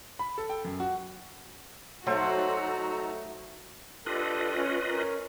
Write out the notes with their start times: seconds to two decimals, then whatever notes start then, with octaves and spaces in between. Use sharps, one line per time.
0.19 B5
0.38 A4
0.50 G5
0.65 F#2
0.80 F#4
2.07 F#3 A3 D#4 F#4 A4 C5 A#5
4.06 D4 F4 G4 A4 B4 D#5
4.56 C#4
4.87 C#4 A#4